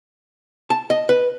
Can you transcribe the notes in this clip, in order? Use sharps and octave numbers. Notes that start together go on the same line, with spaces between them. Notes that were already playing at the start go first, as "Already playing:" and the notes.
A5
D#5
B4